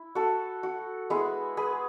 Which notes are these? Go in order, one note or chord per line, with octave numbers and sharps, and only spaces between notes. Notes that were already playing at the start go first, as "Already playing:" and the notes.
Already playing: E4
F#4 A4
F#4
G#3 B3 E4 G#4
G#4 B4